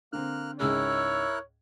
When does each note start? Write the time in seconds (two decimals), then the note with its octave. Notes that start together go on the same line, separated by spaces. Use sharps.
0.13 D3 A#3 C4 F6 F#6
0.60 C#2 G#2 E4 G#4 A#4 C#5 E6 F#6